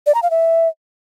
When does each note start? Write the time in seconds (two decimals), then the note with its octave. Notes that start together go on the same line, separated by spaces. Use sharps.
0.06 D5
0.15 A#5
0.23 F5
0.31 E5